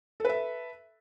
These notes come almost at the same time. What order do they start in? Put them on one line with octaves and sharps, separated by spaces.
A4 B4 E5